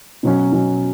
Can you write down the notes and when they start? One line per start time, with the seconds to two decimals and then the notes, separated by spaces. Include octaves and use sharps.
0.23 B2 F#3 C#4
0.52 B2 F#3 C#4